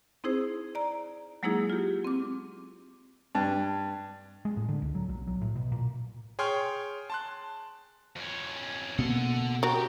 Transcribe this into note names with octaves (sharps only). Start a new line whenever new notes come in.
C4 D#4 E4 G#4 C5
D5 A#5
F#3 G#3 A#3 D#4 E4 G#4
F4 G4
C4 D6
G2
G#3
A2
D3
C#2
F#3
B1
F#3
A2
B2
A#2
G#4 C#5 G5 C6 F6
A5 C6 F#6
F2 C#4
B2 A#3 A4 F#5
F#4 G4 A#4